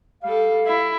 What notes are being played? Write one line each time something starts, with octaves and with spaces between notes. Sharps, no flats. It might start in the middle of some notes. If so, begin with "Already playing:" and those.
G3 A4 F5
E4